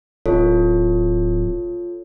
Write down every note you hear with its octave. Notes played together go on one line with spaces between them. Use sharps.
D1 F4 A4 C#5